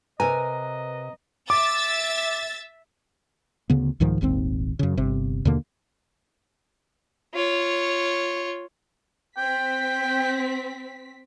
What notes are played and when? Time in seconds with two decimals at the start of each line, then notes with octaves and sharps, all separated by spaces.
0.20 C3 A#4 B4 D#5 G#5 A#5
1.50 E5 D6 E6 A6
3.70 D2 C#3 B3
4.00 C2 G#2 D#3 F3
4.21 D#1 G#1 D#2 C4
4.79 F#2 C#3
4.97 G1 C3
5.45 D#2 B2 D3 A#3
7.34 F4 C#5
9.38 C4 G5 B6